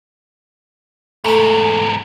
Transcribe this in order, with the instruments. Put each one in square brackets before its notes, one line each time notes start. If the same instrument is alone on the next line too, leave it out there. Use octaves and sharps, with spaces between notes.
[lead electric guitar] E2 G#2 [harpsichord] A3 B5